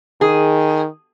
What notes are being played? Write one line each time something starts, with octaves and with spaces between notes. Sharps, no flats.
D#3 G#4